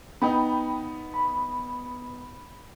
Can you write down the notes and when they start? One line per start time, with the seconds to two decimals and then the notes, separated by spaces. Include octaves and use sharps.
0.22 B3 D#4 G5 B5
1.14 B5